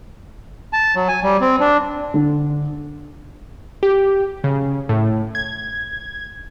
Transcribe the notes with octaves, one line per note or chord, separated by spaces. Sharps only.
A5
F#3
G#5
G3
C4
D4
D3
G4
C#3
A2
G#6